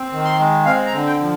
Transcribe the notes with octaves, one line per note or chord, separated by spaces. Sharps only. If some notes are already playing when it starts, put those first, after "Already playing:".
Already playing: C4
D#3
C6
G#3
C4 F5
A#5
D3
G5
F3